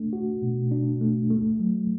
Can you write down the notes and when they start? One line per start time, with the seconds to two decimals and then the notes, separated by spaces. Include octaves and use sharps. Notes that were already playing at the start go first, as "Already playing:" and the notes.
Already playing: A3 D4
0.13 F#4
0.42 B2
0.71 D4
1.01 A3
1.30 A3
1.60 F#3